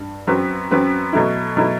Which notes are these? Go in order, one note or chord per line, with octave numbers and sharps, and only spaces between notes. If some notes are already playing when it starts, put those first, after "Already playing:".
Already playing: G2
F#2 F#3 C4 F#4 B4
F#2 F#3 C4 F#4 B4
B2 F#3 A3 E4
B2 F#3 A3 E4